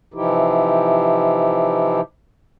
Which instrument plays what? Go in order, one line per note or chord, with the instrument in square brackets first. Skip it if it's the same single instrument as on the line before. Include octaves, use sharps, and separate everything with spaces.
[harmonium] C3 E3 F3 D#4 E4 G4